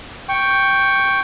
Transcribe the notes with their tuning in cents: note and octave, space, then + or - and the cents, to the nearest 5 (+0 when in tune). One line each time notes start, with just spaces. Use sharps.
G5 +0 C#6 +0